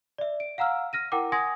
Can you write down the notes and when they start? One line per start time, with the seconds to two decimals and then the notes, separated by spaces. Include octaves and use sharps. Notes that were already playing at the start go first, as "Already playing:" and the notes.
0.18 D5 E5
0.40 D7
0.58 F5 F#5 A#5 E6 F6
0.93 F6 A#6 D#7
1.12 E4 A#4 F#5 G5 D6
1.32 F#5 G#5 C6 D#6 G#6 A#6